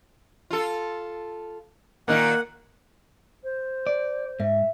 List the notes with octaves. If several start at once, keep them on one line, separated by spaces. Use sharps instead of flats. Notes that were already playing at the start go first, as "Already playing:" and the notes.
F4 A4
A#2 D#3 A#3 D#4 F#5
C5
D5
G#2 E5